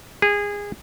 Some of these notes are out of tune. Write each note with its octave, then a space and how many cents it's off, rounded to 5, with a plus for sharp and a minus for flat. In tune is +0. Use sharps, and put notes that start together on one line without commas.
G#4 -20